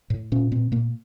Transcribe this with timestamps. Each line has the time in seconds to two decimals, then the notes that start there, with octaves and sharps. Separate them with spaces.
0.10 A2
0.32 A#2 C#4
0.52 A#2 C4
0.72 A#2 A#3